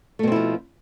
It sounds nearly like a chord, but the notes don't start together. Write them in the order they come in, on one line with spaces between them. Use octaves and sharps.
A3 B2 C4 E4 F3